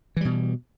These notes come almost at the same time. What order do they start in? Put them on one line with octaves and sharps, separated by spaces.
E3 G3 B2